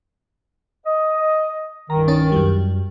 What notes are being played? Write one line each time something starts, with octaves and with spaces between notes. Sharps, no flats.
D#5
C2 G2 D#3 A#5
C#4 D#4 A6
F#2 G3